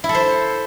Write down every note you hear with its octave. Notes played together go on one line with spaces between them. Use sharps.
E4
A4
C5